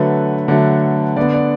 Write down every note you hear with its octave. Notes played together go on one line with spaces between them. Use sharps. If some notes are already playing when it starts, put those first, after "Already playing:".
Already playing: D3 F#3 A3 B4
D3 F#3 A3
D3 B3 D5
D5